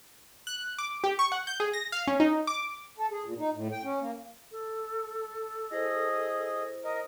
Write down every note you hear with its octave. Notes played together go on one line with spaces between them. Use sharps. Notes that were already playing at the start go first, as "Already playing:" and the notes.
F#6
D6
G4
C#6
F#5
G6
G#4
A#6
F5
C#4
D#4
D6
A4
G#4
A#2
D#4
A2
G5
C#4
A#3
A4
E4 G#4 C5 D#5
A#4 D#5